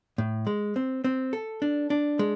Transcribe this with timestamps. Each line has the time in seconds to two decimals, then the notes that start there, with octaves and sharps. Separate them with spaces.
0.18 A2
0.47 G#3
0.76 C4
1.04 C4
1.33 A4
1.62 D4
1.90 D4
2.19 G#3